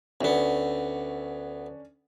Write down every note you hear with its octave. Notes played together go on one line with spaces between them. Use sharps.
D2 B3 C#4 D4 A4